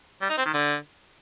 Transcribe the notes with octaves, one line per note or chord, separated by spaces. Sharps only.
G3
D#4
C4
D#3
D3